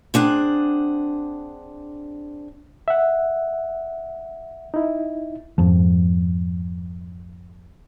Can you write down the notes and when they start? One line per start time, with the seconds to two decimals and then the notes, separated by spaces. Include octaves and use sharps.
0.14 C4 D4 G#4 F#5
2.88 E5 F#5
4.74 D#4 E4
5.58 F2 G#2 F3